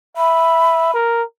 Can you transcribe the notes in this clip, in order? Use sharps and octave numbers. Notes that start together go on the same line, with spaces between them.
E5 B5
A#4